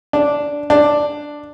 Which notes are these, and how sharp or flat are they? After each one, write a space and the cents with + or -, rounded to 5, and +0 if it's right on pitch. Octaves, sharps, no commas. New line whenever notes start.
D4 -5
D4 +5